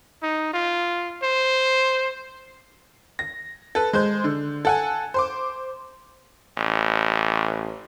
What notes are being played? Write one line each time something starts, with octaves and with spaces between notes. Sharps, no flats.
D#4
F4
C5
A#6
A4 B4
G#3 C5 G6
D3
A4 F#5 G#5
C5 C6 D6
A1